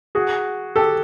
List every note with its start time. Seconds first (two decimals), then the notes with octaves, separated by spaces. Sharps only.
0.15 F#4 G#4
0.76 G4 A4